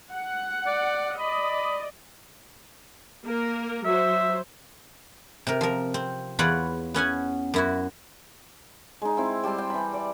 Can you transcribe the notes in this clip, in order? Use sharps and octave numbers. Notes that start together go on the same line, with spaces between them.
F#5
D5
D5 D#5 B5
A#3 A#4
F#3 C5 E5
C3 A#4
F3 A#4
C4
E2 F4 B4 C#5 D5 F#5
B3 C#4 F#5 G#5
F#2 E4 F#4
G#3 D#4
C4 E4
G3 G4 A5 C6
G5
E3 B5
D5